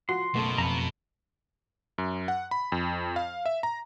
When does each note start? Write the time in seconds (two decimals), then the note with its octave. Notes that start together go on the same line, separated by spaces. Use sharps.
0.09 F3 F#4 C6
0.35 F#1 B2 A3 A4
0.58 F2 A#5 B5
1.98 F#2
2.28 F#5
2.51 B5
2.72 F2
3.16 F5
3.46 E5
3.63 A#5